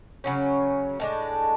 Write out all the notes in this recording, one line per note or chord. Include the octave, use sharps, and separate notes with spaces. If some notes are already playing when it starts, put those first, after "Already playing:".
C#3 F#3 C#4
A2 G#3 D4